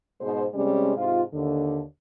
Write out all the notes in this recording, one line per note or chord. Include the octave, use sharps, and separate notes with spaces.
G#2 B2 G#3 C5
C3 G3 G#3 C#4
G#2 C3 F4
D#2 D3